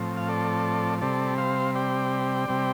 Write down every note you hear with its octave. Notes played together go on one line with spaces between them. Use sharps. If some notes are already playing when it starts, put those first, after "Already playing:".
Already playing: A2 F3 C4
F5
A4 D5
C3 G3 C4 A4 D5
C5 F5
D5 G5
C3 G3 C4